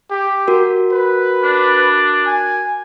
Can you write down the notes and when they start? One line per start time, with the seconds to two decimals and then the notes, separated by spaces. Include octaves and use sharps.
0.10 G4
0.48 F#4 A#4
0.92 B4
1.43 D4
2.26 G#5